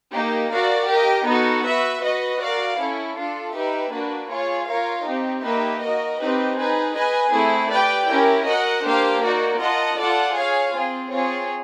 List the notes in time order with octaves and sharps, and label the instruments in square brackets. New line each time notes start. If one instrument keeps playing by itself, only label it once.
[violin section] A#3 D#4 G4
F#4 A#4 D5 F5
G4 A#4 D#5
B3 D#4 F#4 A4
F#4 B4 E5
F#4 B4 D#5
F#4 A#4 D5 F5
C#4 E4 A4
D4 F4 A4
D#4 G4 B4 E5
A#3 D4 F#4 B4
F4 G#4 C#5
F4 A#4 C#5 F5
C4 D#4 G4
A#3 D#4 G4 B4 E5
F#4 A#4 D#5
C4 D#4 G4 B4
D#4 G#4 B4
G#4 B4 D#5 G#5
A3 C4 E4 G#4
G4 B4 D5 G5
C#4 E4 G4 A#4
F#4 A#4 D#5 F#5
A#3 D4 G4 C5 F5
A#3 D#4 F#4 A#4 D5
F4 A#4 D#5 F#5 A5
F4 A4 D5 F#5 A5
G#4 C#5 F5 G#5
C4 F4 G#4
C4 F4 G#4 C#5